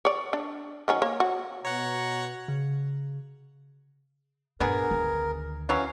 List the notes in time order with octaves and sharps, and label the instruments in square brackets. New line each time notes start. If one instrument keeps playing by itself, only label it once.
[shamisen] C#5 D5
D4
D#3 F#3 C#4
A#3 C#5
F#4
[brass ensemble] B2 [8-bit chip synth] C#5 F#5 [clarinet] A#5
[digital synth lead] C#3
[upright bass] G2 A#2 [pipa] B3 D4 G#4 [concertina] A#4
[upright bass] D2 D#3
[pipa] E3 F#3 C#4 [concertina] F5